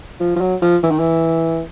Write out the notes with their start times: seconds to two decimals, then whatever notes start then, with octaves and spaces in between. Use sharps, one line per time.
0.20 F3
0.36 F3
0.41 F#3
0.62 F3
0.83 E3
0.91 D#3
0.99 E3